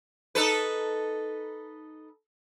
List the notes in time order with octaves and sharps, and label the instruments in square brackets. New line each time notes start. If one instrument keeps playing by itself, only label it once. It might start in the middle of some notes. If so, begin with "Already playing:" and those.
[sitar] D#4 A4 B4